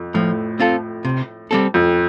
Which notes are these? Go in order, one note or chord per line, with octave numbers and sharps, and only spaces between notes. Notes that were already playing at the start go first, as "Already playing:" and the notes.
Already playing: F2
A2 F3
C4 F4 A4
C3
G3 C4 A4
F2